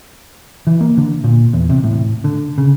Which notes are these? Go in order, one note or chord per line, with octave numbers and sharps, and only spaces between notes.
E3
A#3
D3
A#2
E2
C3
A2
D3
C#3